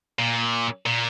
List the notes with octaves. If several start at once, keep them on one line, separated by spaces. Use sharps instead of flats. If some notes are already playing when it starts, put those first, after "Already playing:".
A#2
A#2